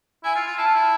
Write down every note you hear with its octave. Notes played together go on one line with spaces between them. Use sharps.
E4 G#5
F4
F4
E4 A5
F4
E4